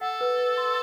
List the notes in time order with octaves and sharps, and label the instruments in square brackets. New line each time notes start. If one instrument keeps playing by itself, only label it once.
[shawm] A4 [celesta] F#5
[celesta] B4
B4
C6